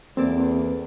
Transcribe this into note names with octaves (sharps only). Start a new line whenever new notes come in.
E2 A#3 C4 A4 D5